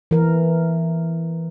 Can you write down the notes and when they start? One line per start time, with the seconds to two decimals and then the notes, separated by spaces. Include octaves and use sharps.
0.11 E3 A#4